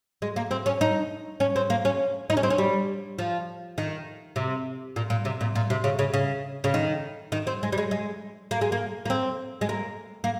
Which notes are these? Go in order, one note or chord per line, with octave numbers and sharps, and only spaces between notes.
G#3
A#3
C4
C#4
D#4
C#4
C4
A#3
C#4
D#4
C#4
C4
C#4
G3
F3
D#3
C3
A#2
A#2
C3
A#2
A#2
C3
C#3
C#3
C#3
C#3
D#3
D#3
C4
G#3
G3
G#3
G#3
A#3
G#3
A#3
A#3
C4
G#3
A#3
A#3